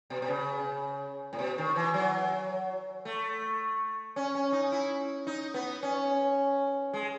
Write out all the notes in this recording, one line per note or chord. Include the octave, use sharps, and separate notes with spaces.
B2
B2
C#3
A2
B2
D#3
E3
F#3
A3
C#4
C#4
D#4
E4
D#4
B3
C#4
G#3